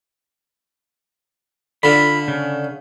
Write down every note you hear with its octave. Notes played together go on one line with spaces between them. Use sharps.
D3 F4 B5
C#3